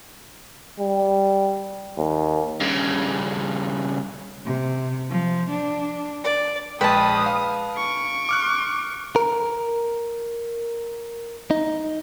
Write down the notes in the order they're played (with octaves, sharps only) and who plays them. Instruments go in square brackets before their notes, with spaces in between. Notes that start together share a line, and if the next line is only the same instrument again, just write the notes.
[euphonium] G3
D#2
[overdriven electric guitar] G2 C#3
[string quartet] C3
F3
D4
D5
[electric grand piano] A#1 G#3 G5 [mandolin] B4 A5 [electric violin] D#6
[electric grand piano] F5
[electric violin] C#6 D7
[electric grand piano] D6 F6 F#6
[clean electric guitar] A#4
D#4